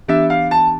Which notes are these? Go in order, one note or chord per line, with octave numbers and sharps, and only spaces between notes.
E3 B3 D4 G4 E5
F5
A5